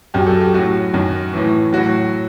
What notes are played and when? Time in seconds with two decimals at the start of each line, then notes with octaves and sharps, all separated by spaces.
0.14 F#2 F#3 G4
0.27 A4
0.41 G4
0.54 A2 F#3 F#4
0.94 F#2 D#3 F#3
1.33 A2 E3
1.73 A2 F#3 F#4